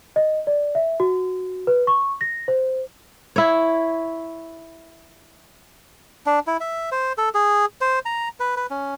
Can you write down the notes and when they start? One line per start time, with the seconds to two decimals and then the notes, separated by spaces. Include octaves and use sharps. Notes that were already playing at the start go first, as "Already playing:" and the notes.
0.16 D#5
0.47 D5
0.75 E5
1.00 F#4
1.67 B4
1.87 C#6
2.21 A#6
2.48 C5
3.36 E4 C#5
6.26 D4
6.47 E4
6.60 E5
6.92 C5
7.18 A4
7.35 G#4
7.81 C5
8.05 A#5
8.40 B4
8.57 B4
8.70 C#4